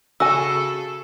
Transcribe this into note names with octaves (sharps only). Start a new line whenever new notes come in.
C#3 F#4 A4 G#5 E6